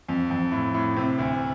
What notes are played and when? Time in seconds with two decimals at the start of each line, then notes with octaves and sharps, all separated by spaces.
0.09 F2
0.31 F2
0.52 A2
0.74 A2
0.97 C3
1.19 D2